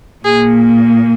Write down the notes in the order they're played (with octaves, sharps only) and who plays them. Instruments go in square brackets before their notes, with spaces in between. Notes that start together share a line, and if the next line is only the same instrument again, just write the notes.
[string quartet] A#2 A#3 G#4